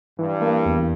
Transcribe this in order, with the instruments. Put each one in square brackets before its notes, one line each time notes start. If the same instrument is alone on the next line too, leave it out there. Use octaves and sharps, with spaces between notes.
[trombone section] G2 [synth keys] E3
[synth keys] A#3
E2